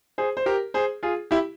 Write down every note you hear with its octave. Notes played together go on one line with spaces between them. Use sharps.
G#4 C5
C5
G4 A#4
G#4 C5
F4 G#4
E4 G4